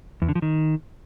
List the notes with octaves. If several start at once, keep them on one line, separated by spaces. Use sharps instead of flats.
E2
D3
F3
D#3